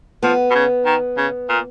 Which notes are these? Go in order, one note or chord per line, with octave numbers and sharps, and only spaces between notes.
F3 B3
B2
C#3
D#3
C#3
A#2